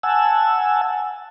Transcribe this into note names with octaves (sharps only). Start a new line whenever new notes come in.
F#5 G#5 A5 E6